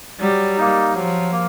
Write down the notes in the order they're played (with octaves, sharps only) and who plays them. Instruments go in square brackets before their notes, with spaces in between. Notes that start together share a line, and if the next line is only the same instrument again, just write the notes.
[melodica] F#3 [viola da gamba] G3
[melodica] A#3 D#4
[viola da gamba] F3 [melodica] F#3
[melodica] A#3